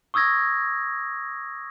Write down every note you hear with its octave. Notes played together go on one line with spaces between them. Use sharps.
C#6 D#6 E6 G#6 A#6